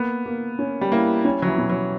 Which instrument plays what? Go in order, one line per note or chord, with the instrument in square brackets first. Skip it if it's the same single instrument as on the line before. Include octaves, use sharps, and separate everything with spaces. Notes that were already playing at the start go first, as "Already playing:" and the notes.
Already playing: [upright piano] A#3 [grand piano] B3
[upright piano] A#3
C#4
[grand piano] G3
[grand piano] A#3 [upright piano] E4
[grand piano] G3 [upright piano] C#4
[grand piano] F#3
E3
[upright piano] B2
[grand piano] F#3